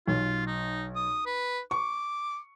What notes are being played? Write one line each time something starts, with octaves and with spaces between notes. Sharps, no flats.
B1 F4
D#4
D#6
B4
C#6 D6